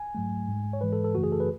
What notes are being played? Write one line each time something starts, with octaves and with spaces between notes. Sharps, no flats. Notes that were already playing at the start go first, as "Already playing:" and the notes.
Already playing: G#5
G#2 F#3 A3
G#2 G#3
C#5
G#2 E3 G#3 B4
A4
A4
F#2 C#3 E3 A3 F#4
G#4
A4
B4